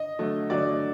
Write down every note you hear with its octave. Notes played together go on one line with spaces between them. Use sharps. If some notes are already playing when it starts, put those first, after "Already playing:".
Already playing: D#5
D3 F#3 A3
D3 F#3 A3 D5